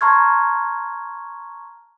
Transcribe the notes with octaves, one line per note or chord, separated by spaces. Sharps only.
A5 A#5 C6 C#6 F6 G#6